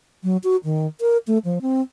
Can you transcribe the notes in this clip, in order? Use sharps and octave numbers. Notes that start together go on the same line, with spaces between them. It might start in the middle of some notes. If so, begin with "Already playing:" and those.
F#3
F#4
D#3
A#4
A3
F3
C4